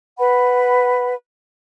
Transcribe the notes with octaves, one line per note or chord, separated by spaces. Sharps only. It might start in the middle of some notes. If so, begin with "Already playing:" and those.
B4 F#5 B5